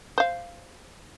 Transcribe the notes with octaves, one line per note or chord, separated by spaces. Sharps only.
C5 F5